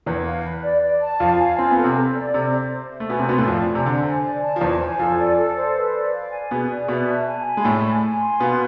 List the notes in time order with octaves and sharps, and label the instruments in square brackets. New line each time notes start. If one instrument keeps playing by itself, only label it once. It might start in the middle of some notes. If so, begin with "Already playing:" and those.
[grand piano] E2 E3 [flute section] B4
[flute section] F5
B4
D5
D5
A5
[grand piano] F2 F3 [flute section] F5
[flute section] G#5
[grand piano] C4 [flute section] F4
[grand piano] B3
[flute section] A4
[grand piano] C3 C4
[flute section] A4
D5
[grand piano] C3 C4 [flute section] A4
[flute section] D5
C5
E5
[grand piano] A3
[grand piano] B2 B3 [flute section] G#5
[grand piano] C3 C4
[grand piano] B2 B3 [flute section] C6
[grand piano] A2 A3
[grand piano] F2 F3 [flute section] D5
[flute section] G#5
[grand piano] C3
[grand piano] D3 [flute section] C5
[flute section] G#5
D5
A5
[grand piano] F3
[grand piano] E2 E3 [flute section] C5
[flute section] G#5
[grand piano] F2 F3 [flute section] A4
[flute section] D5
A4
C5
B4
D5
F5
G#5
[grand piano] B2 B3 [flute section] G#4
[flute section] D5
[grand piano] B2 B3 [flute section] E5
[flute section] A5
G#5
B5
[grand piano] G#3
[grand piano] A2 A3 [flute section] D5
[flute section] G#5
G#5
C6
[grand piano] B2 B3 [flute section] F5